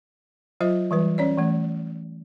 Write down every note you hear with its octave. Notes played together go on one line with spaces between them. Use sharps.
F#3 F4 C5 D#5
E3 G3 B4
C#4 C#5 D5
E3 A3